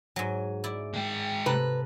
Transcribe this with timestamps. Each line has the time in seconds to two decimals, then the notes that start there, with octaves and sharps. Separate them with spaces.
0.16 G#2 F#3 G#5
0.64 E4 D5
0.94 G#3 G5
1.46 C3 A4 B4 A#5